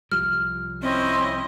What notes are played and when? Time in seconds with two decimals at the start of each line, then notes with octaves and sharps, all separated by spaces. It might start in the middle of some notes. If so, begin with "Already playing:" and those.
0.12 C2 F3 G3 F6
0.82 C4 C#4 E4 D#5